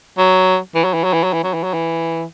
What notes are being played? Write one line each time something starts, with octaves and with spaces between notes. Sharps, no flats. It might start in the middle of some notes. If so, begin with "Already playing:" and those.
F#3
E3
F#3
E3
F#3
E3
F#3
E3
F#3
E3
F#3
E3